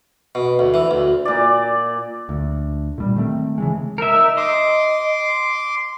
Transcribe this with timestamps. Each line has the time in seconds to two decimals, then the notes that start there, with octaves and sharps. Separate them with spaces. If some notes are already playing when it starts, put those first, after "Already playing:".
0.35 B2
0.59 D2
0.74 E3
0.91 D2
1.25 A#2 D5
2.29 D2
2.98 A#2 G3
3.16 D#3 A3 C4
3.58 C#3 E3 G#3
3.98 A#4 E5
4.12 D#4
4.37 D#5 C6 D6